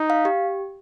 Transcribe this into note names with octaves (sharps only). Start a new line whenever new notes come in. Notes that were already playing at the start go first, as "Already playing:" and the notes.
Already playing: D#4
F5
G4